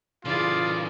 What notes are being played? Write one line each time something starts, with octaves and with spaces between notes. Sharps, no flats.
C#3 E3 F4 G#4 D5